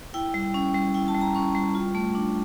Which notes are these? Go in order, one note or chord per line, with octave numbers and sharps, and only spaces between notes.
E4 G5
G3
C#4
G3
E4 G5
A5
G3
A#5
C#4 C#6
G3
F4
A3
D4